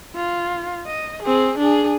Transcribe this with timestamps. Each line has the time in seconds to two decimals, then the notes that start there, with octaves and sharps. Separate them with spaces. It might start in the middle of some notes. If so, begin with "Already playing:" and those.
0.16 F4
0.87 D#5
1.23 C4 G#4
1.58 D4 G#4